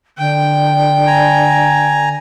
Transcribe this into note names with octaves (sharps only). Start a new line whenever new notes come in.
D3 G5
G#5 A#5